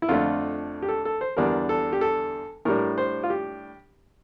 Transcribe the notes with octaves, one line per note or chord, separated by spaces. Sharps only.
E4
F2 D3 A3 D4 F4
G4
A4
A4
C5
E2 D3 G3 D4 A#4
A4
G4
A4
A2 G3 D4 A#4
C5
F4
G4